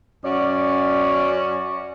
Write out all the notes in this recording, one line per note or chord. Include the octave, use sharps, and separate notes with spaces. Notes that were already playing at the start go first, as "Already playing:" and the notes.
F#2 C#4 F#4 D5